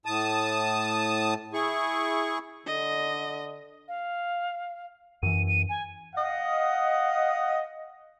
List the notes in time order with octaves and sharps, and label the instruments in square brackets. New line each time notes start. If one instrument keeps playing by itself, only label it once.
[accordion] A2 A5 D#6
E4 G#4 C#6
[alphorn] D3 [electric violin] D#5
[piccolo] F5
[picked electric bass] F#2 E3 [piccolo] D#7
[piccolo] D#7
G#5
[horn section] D#5 F5 F#5